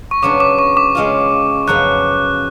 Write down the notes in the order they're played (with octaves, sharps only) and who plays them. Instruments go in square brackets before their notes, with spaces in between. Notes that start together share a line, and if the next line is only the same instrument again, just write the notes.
[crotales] C#6
[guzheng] C#3 F#3 B3 D4 [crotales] D6
[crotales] D6
C#6
D6
[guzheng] C#3 G#3 C#4 F4
[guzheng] F#2 C#3 F3 B3 [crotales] F#6